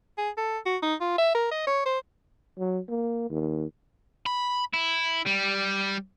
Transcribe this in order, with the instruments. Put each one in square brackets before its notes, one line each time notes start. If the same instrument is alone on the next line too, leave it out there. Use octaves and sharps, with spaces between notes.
[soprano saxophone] G#4
A4
F#4
D#4
F4
E5
A#4
D#5
C#5
C5
[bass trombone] F#3
A#3
D#2
[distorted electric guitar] B5
E4
G3